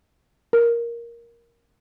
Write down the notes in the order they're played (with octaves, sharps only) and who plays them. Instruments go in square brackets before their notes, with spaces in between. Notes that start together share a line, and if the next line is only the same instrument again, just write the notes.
[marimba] A#4